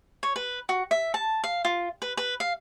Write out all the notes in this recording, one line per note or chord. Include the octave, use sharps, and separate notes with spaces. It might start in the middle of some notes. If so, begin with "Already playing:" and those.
C#5
B4
F#4
E5
A5
F5
F4
B4
B4
F5